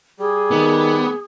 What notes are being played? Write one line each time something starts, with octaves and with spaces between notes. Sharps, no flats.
G3 G#4
D#3 B3